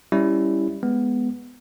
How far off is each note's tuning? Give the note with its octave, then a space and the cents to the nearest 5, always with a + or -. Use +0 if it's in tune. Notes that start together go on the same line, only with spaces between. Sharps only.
G3 +15 C#4 +0 E4 +0
G#3 +5 B3 +0